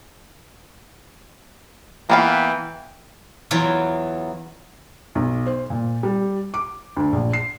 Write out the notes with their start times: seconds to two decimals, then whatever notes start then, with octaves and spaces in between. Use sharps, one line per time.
2.10 E3 A#3 B3 F5 G5
3.51 E2 E3 F#3 B3 E4 F4
5.15 B1
5.46 C5
5.70 A#2
6.03 G3
6.54 D6
6.96 D2
7.12 A#1
7.33 C7